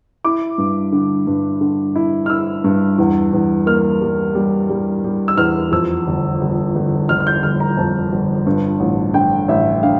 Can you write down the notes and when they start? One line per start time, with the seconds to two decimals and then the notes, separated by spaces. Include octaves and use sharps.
0.24 E4 D6
0.58 G2
0.92 D3
1.27 G2
1.61 D3
1.96 E4
2.26 F6
2.29 E4 E6
2.64 G2
2.98 E2
3.33 E2
3.66 A#3 F6
4.01 G3
4.35 G3
4.69 G3
5.04 G3
5.28 E6
5.38 E2 F6
5.72 F2 E6
6.07 G1
6.41 G1
6.75 G1
7.09 G1 F6
7.20 F6
7.27 G6
7.43 G1 F6
7.60 A#5
7.77 F2 A5
8.12 G1
8.47 G2
8.80 A1
9.14 D3 G5
9.48 A1 E5
9.83 D3 F5